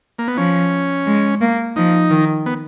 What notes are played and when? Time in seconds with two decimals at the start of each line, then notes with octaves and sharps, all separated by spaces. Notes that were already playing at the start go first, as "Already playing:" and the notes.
0.19 A#3
0.28 B3
0.37 F3 C#4
1.07 G#3
1.41 A#3
1.76 F3 D#4
2.11 D#3
2.46 B3